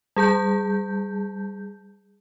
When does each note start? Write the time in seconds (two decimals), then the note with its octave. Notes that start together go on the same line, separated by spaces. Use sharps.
0.16 G3 G#4 A5 G6